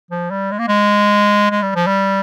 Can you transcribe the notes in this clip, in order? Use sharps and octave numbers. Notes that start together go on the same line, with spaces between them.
F3
G3
G#3
A#3
G#3
G#3
G3
F3
G3